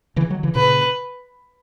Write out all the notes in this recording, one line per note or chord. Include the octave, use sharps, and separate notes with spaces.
C#3 E3
D#3 F#3
C#3 E3
A#2 C#3 B4